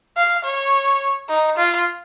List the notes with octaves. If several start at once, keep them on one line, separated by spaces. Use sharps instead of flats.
F5
C#5
D#4
F4